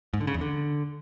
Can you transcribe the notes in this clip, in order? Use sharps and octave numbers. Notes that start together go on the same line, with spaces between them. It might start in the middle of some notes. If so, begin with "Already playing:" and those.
G#2
D3
C#3
E2
D3